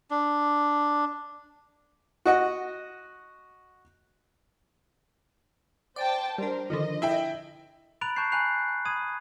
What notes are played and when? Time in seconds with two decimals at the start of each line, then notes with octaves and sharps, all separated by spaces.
0.11 D4
2.26 F#4 D#5 F#5
5.96 C5 D5 G5 A5
6.38 G3 D4 A#4 C5
6.70 D3 D#3 F3 D#5
7.02 E4 E5 G5
8.01 A#5 B5 F#6 A6 D7 F7
8.16 A5 C#6 F#6 G6 C7
8.32 G#5 A#5 B5 F#6 C7 F7
8.85 B5 D#6 G#6 D#7